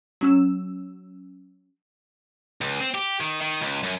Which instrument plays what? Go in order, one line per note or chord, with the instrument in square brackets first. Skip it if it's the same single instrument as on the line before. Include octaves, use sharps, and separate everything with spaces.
[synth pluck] F#3 C#4 E6
[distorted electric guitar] C#2
C4
G4
D#3
D#3
C#2
F#2